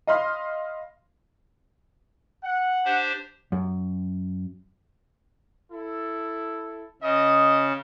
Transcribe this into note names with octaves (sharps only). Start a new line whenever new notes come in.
D#5 F5 B5 C6 F6
F#5
D4 G4 C5
F#2
E4 A4
C#3 D#5